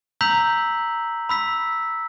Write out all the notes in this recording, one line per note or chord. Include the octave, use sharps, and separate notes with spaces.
A#5 E6 G6 B6 F7 F#7
B5 E6 B6